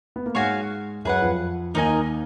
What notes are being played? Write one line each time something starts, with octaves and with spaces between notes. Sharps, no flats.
B3
A#3
G#2 G#3 F#4 C#5 F5 G#5
F#2 F#3 G#4 B4 F#5
F2 F3
D#2 D#3 D#4 A#4 D#5 G#5